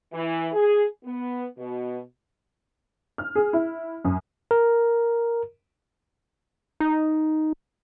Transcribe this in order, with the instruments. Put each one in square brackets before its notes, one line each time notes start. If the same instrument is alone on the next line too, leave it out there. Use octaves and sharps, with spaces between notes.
[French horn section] E3
G#4
B3
B2
[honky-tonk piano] F6
G#4
E4
F#2
[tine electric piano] A#4
[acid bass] D#4